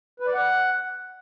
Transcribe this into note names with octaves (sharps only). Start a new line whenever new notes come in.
B4
D5
F#5